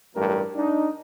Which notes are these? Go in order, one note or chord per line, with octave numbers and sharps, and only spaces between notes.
A1 G2 F#3 A3 A#4
D4 D#4